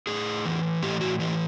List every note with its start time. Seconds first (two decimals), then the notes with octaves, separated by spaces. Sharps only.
0.07 A2 G#4
0.45 E3
0.82 A2 G4
1.01 F#4
1.20 E3 G4